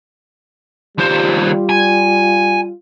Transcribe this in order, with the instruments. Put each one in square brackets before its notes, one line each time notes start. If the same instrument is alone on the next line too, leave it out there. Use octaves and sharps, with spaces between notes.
[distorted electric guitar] D#2 C5 [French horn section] G3 F4
[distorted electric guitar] G#5